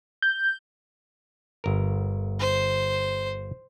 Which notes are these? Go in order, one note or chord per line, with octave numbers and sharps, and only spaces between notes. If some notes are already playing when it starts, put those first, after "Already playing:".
G6
G1 A#4
C5